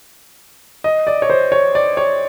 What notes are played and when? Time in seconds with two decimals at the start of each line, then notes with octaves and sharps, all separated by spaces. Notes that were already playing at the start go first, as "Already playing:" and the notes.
0.84 D#5
1.07 D5
1.22 C#5
1.30 C5
1.52 C#5
1.75 D5
1.97 C#5